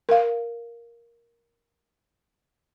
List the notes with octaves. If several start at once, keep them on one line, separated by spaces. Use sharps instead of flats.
A#4 F5